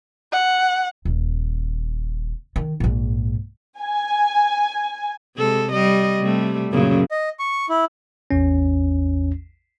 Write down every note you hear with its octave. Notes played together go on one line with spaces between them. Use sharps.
F#5
D#1
D#3
A#1 G#2
G#5
C3 G#3 A4
G3 D#5
C3 G3 A3
F#2 A#2 C#3
D#5
C#6
E4
A1 E2 C#4